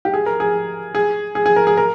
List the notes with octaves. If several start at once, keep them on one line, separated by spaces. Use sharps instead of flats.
G4
G#4
A#4
G#4
G#4
G#4
G#4
A#4
G#4
A#4